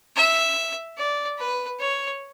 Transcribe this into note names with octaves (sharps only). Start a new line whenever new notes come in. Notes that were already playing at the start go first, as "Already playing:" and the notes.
E5
D5
B4
C#5